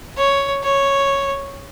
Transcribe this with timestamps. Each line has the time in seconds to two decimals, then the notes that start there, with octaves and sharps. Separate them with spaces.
0.17 C#5
0.64 C#5